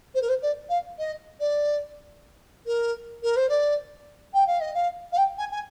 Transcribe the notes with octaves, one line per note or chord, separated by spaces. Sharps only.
C5
A#4
C5
D5
F5
D#5
D5
A#4
A#4
C5
D5
G5
F5
D#5
F5
F5
G5
G#5
G#5